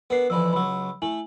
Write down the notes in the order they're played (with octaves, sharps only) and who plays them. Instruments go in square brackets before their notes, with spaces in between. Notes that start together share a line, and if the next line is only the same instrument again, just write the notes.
[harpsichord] B3 D4 [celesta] A#4 B4 C7
[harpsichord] F2 D3 E3 [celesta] B5 E6
[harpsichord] C#2 F#3 [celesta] B5 E6
[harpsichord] A3 [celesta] E4 G#5 F#7